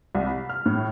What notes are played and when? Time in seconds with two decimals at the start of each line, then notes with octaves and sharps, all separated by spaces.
0.15 C2
0.27 B5
0.49 F6
0.66 A2